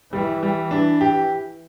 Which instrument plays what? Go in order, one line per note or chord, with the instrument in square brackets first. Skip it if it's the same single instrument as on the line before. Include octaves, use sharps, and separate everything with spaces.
[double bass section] E3 [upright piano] G3
[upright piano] G3
D4
G4